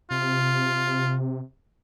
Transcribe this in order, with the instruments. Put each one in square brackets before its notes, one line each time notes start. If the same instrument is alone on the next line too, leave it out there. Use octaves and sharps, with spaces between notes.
[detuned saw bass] C3 [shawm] F4